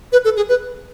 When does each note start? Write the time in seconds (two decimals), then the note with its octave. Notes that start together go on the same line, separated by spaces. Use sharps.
0.12 B4
0.25 A4
0.37 G#4
0.49 B4